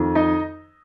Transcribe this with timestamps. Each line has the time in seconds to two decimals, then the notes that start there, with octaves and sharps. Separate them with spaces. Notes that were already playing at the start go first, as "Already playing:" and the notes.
Already playing: F2 D#3
0.15 D#4 D#5